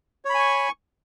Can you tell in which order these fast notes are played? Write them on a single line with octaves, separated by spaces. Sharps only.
C#5 B5 G#5 C#6